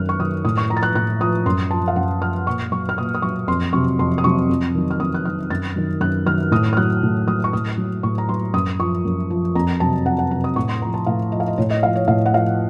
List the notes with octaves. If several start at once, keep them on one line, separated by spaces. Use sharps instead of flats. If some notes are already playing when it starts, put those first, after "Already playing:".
Already playing: F#2 D#3 F#3 F6 F#6
C#6
D#3 F#3 D#6
A2 D#6
C#6
F3 A#5
A6
F#6
A2 F#6
F3 D#6
F#2 C6
F3 A5
F5
F#2 F#5
F3 F6
A#2 C#6
F#3 C#6
F6
A#2 D#6
D#6
F#3 C#6
F2 C6
C3 F#3 C#6
F2 C6
D#6
C3 F#3 C#6
F2
D#3 F#3
F6
F2 D#6
F#6
D#3 F#3 F6
F#2 A6
D#3 F#3
F#2 F#6
D#3 F#3 F6
A2 D#6
F6
F#3 F#6
A2
F#3 D#6
C#6
A2 D#6
F#3
A2 C#6
A#5
F#3 C6
F#2 D#6
F3 C#6
F#2
F3
F2 A#5
C3 F#3 A5
F2 F#5
F#5
C3 F#3 A5
D#6
A2 C#6
C6
F3 A#5
A5
A2 F5
F3 D#5
F5
D#5
A2 C#5
D#5
F3 F5
C#5
A2 F5
F#5
F3 F5